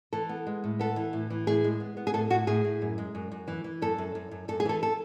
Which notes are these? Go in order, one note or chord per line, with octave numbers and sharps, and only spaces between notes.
E3 A4
B3
G#3
A2
B3 A4
E3
A2
E3
A2 G#4
G#3
B3
B3
G#4
A2 A4
A2 F#4
A2 G#4
A2
F#2
G#3
F#2
F#2
E3
E3
F#2 A4
F#2
F#2
F#2
F#2 A4
G#4
E3 A4
A4